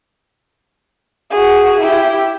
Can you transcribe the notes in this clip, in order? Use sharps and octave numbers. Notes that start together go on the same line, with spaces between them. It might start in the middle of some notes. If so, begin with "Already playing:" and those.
F#4 G#4
E4 G4